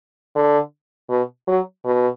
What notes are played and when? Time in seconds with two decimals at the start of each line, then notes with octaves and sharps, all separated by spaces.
0.36 D3
1.10 B2
1.48 F#3
1.85 B2